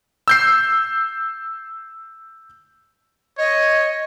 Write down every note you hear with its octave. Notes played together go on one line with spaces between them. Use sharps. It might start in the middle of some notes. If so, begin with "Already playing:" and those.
E6 G6 C7
C#5 D#5